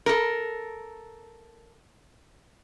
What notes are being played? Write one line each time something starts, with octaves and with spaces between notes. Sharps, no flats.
A4 A#4